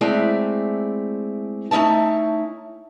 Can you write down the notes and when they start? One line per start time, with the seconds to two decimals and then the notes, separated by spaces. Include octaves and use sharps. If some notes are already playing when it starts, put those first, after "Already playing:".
0.01 G#3 A3 C4 E4 D5
1.71 A3 C#4 D#4 E4 A5